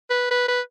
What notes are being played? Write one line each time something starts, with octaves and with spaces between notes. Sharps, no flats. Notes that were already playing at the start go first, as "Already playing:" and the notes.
B4
B4
B4